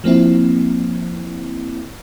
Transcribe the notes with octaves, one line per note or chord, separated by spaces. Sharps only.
F3 A#3 C4 E4